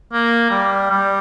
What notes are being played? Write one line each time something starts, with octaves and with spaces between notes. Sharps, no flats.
A#3
G3
G3